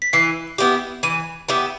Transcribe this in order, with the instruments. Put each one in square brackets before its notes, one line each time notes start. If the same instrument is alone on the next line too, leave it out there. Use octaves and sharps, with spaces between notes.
[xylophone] B6
[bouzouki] E3 [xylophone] C7
[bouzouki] B3 E4 G4
[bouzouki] E3 [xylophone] D#7
[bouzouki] B3 E4 G4